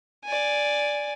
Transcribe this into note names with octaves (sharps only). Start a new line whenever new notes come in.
D5 G#5